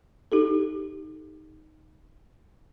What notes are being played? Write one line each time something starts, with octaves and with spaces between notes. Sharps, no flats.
D#4 G4 A4